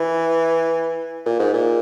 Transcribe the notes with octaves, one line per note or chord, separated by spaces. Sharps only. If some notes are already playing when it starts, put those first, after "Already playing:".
Already playing: E3
A#2
G#2
A#2